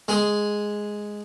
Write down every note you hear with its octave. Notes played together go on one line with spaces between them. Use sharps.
G#3 G#4